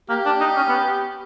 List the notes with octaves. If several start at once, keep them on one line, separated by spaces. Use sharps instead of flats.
A#3 G4
D4
D#4
C#4
B3